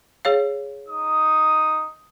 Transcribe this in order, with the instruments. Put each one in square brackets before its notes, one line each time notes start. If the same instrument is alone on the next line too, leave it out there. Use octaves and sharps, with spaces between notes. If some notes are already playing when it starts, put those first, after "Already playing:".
[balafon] G#4 C#5 F5
[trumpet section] D#4 D#6